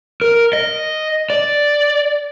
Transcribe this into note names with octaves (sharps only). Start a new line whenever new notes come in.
A#4
D#5
D5